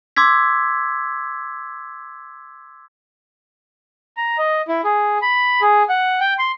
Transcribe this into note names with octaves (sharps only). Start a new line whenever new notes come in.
C6 D6 E6 G#6 B6
A#5
D#5
E4
G#4
B5
G#4
F#5
G5
C6